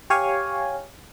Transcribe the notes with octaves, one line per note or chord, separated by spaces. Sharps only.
G4 C#5 F5 G#5